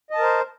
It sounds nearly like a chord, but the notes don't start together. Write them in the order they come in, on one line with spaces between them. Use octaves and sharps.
D#5 A5 A#4 C5